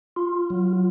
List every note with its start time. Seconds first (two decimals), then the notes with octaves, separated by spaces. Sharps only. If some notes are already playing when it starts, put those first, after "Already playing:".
0.16 F4
0.50 F#3